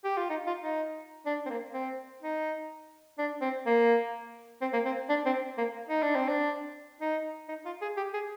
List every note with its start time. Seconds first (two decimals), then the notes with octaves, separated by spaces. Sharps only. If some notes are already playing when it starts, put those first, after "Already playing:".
0.04 G4
0.17 F4
0.30 D#4
0.47 F4
0.62 D#4
1.26 D4
1.46 C4
1.50 A#3
1.74 C4
2.22 D#4
3.18 D4
3.41 C4
3.66 A#3
4.61 C4
4.73 A#3
4.85 C4
5.09 D4
5.26 C4
5.58 A#3
5.89 D#4
6.02 D4
6.16 C4
6.29 D4
7.01 D#4
7.49 D#4
7.66 F4
7.82 G#4
7.97 G4
8.14 G#4